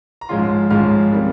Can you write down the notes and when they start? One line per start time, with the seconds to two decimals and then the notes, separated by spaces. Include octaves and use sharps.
0.21 A#5
0.29 G#2 F3 G#3 C#4 F4 C6
0.70 G#2 F3 G#3 C#4 F4 F6
1.12 D#3 G3 C4